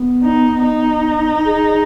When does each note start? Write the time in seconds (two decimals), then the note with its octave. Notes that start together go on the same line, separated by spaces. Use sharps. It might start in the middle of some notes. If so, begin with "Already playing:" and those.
Already playing: B3
0.23 D#4
0.63 D#4
1.45 G#4